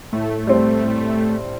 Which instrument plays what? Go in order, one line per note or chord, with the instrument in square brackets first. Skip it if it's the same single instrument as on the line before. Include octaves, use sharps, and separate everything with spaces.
[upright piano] A2 [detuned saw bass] A3
[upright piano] G3 C4
A2